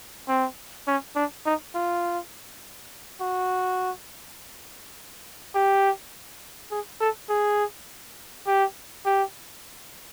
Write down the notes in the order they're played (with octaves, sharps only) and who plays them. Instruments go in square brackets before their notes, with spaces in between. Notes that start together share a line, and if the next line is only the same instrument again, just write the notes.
[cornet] C4
C#4
D4
D#4
F4
F#4
G4
G#4
A4
G#4
G4
G4